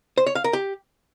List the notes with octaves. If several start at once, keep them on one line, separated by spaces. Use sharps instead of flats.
C5
C#5
F5
A#4
G4